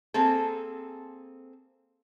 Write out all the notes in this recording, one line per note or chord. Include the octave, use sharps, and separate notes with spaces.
A#3 C4 G#4 A4